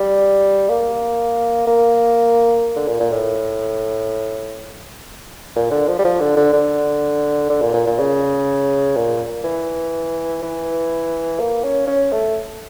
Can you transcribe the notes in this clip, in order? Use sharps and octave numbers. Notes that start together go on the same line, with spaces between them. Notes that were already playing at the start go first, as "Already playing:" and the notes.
Already playing: G3
A#3
A#3
D3
A#2
A#2
A2
A#2
D3
F3
G3
F3
D3
D3
D3
D3
A#2
A#2
A#2
C#3
A#2
E3
E3
A#3
C#4
C#4
A3